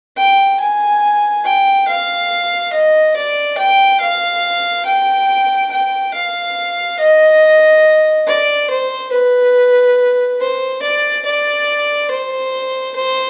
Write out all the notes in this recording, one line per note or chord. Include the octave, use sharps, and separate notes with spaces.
G5
G#5
G5
F5
D#5
D5
G5
F5
G5
G5
F5
D#5
D5
C5
B4
C5
D5
D5
C5
C5